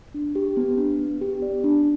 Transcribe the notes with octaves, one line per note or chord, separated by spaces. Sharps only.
D4
G4
B3
D4
B3
G4
D5
D4